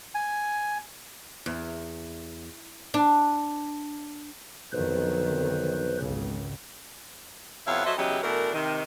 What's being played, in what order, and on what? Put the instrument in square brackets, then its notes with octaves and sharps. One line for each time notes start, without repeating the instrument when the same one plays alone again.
[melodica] G#5
[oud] E2
D4
[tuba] B1 [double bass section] F2 D3 D#3 [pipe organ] B4 C5
[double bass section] G#1 C#2 C#3
[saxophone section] F2 C3 B3 E4 C#5 F5
F#3 A4 C5 D#5 E5
E2 C#3 F#3 E4 G4 D#5
B2 E3 A3 D4 A#4
C3 D#3